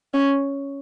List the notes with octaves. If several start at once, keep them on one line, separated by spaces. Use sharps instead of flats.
C#4